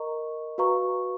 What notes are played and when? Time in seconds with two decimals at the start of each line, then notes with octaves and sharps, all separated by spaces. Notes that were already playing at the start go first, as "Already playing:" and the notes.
Already playing: A#4 D#5 A#5 C#6
0.58 F#4 B4 F5 A#5 C#6